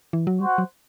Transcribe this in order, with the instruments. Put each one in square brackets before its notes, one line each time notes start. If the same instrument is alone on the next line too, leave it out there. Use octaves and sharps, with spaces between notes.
[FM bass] E3
F#3
[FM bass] G3 [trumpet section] F#4 C5 F#5
[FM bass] F#3